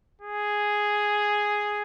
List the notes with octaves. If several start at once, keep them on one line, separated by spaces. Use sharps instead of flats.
G#4